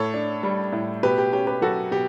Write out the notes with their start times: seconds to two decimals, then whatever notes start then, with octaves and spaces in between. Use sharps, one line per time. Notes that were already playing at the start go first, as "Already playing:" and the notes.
Already playing: A2 A4 C#5
0.14 D4
0.43 G3
0.72 A2
1.03 B2 G4 B4
1.18 G4
1.33 C#4 G4
1.47 G4 B4
1.62 F#3 F#4 A4
1.91 B2 G4